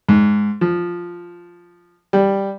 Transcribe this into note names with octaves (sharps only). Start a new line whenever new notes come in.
G#2
F3
G3